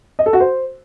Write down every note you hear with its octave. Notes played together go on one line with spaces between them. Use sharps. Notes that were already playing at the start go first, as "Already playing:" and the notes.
D#5
A4
F#4
C5